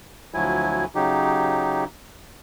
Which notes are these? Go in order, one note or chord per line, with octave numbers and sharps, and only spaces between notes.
D2 F3 F#3 E4 G#5
C#3 F#3 D#4 G4